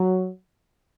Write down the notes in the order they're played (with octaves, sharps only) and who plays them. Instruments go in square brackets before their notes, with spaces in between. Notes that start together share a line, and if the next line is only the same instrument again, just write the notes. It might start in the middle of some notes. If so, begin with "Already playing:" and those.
Already playing: [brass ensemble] F#3